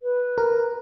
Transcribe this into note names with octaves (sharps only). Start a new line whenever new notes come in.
B4
A#4